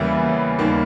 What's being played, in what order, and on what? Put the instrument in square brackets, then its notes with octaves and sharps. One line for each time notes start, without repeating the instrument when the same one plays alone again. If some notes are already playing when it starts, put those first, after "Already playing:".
Already playing: [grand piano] E2 C#3 E3 G3 A#3 E5
D#2 D#3 G3 A#3